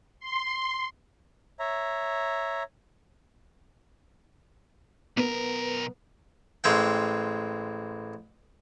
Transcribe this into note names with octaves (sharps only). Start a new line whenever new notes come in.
C6
C#5 E5 A#5
B1 B3 A#4
A1 G#3 C4 G5